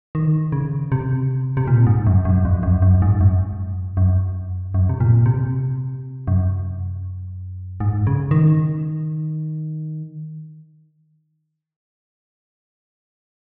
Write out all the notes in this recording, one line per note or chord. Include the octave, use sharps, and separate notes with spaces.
D#3
C#3
C3
C3
A#2
G#2
F#2
F#2
F2
F#2
F#2
G#2
F#2
F#2
F#2
C3
A#2
C3
F#2
G#2
C#3
D#3